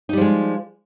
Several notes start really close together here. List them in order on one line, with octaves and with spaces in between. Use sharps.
D#4 G3 F3 G#3